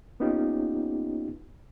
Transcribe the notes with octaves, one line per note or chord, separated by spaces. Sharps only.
A#3 B3 C#4 D#4 F4 G4